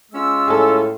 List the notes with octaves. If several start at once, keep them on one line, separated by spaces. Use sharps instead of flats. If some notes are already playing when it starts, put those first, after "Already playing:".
G#3 C#4 F4 E6
A2 G#4 A4